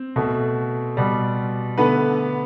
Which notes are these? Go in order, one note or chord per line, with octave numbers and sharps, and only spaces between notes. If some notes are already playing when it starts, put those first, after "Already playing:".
Already playing: C4
B2 A3
B2 G3
D3 A3 B3 B4